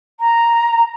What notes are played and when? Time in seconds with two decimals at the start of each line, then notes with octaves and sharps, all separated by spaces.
0.20 A#5